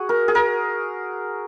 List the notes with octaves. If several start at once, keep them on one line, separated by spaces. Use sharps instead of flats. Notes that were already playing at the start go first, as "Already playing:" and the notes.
Already playing: F#4 G#4
A#4
G#4
A#4